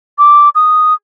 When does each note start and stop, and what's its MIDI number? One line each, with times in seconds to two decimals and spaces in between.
0.18 0.49 86
0.55 0.94 87